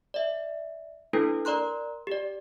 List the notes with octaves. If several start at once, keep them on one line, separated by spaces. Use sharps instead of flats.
D5 E5
A#3 D4 E4 A4 B4
A#4 D5 A#5 C6 F#6
G4 D5